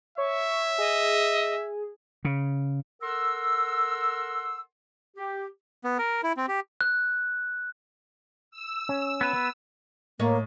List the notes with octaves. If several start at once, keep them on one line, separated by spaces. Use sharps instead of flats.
C#5 E5 C#6
G#4 D#5
C#3
A4 A#4 F#5 C6 E6
G4
B3
A#4
E4
C4
G4
F#6
E6
C#4
B3 B4
A2 A#3 C#5 D#5